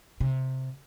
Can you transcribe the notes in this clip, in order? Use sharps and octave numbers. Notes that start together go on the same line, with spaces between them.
C3